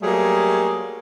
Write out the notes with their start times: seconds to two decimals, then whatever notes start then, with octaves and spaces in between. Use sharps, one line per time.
0.02 F#3 G3 A3 A#3 G#4